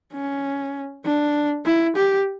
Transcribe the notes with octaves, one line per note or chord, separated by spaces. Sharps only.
C#4
D4
E4
G4